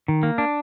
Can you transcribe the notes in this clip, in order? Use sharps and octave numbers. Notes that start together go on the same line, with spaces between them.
D#3
A#3
D4